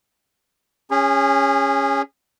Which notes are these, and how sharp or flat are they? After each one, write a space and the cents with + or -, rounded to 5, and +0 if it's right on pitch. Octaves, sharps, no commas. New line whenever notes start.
C#4 +0 G#4 -30